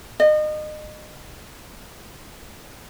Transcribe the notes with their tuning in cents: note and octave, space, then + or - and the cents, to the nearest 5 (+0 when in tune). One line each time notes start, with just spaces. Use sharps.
D#5 -30